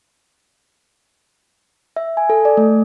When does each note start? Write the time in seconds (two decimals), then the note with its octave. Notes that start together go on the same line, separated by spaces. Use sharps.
1.96 E5
2.17 G#5
2.30 A4
2.45 D5
2.57 A3